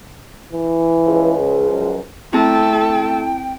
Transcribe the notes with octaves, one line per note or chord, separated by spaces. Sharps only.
E3
C#2 F3
C#3
F#2
A3 C4 E4 A4 G5 A5